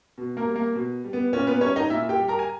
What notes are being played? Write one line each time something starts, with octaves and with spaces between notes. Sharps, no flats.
B2
A#3 A#4
G3
A#3 A#4
B2
G3
B3
A#2 C#4
B3 B4
G3 C#4 C#5
D#4 D#5
A#2 E4 E5
G4 G5
G3
A#4 A#5
G#5